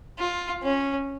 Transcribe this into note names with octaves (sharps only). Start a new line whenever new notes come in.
F4
C#4